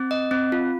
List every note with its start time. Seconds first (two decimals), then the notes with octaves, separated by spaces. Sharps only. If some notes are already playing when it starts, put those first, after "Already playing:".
Already playing: C4
0.11 D#5
0.31 C4
0.52 F4